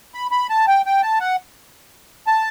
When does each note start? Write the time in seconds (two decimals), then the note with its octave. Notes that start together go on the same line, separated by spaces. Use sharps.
0.15 B5
0.31 B5
0.50 A5
0.67 G5
0.86 G5
1.03 A5
1.20 F#5
2.27 A5